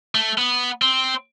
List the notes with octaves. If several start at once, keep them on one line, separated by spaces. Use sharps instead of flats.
A3
B3
C4